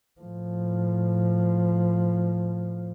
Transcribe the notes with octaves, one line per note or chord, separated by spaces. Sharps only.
A2 F3